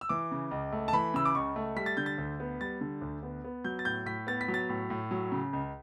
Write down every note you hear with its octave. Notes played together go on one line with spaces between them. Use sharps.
E6
E3 D6
C#3
C#2
A3
A5
E3 B5
C#3 E6
D6
C#2 C#6
A3
G3 B6
A6
D3 G6
A6
D2
B3
G3 A6
D3
D2
B3
B3
F#3 G6
A6
A2 G6
A2 B6
B3 A6
B6
F#3
A6
A2
A2
F#3
C#3
C#2